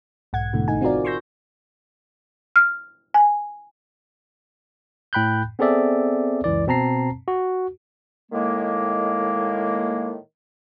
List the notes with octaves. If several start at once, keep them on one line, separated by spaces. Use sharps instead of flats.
B1 G#2 F#5 G#6
G#2 B2 D3 E3 A3
G#1 A3 D#4 G#5
C4 F4 F#4 A#4 D5
C6 C#6 E6 G6 A#6
F6
G#5
A2 G5 B5 F#6 G6
B3 C4 G#4 A4 D5 E5
C#2 F#2 E3 D5
B2 C4 A5 A#5 C7
F#4
A2 D#3 G#3 A#3